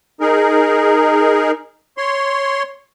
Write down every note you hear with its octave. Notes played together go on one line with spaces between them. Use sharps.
D#4 G#4 A#4
C#5 C6